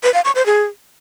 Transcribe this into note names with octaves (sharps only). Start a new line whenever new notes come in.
B4
F5
C#6
C5
G#4